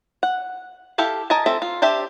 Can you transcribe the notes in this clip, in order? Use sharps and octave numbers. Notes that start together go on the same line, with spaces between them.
F#5
E4 G4 A4 F5
A#4 D#5 G#5 A5
F3 C4 A4 E5
F4
D4 G4 C5 E5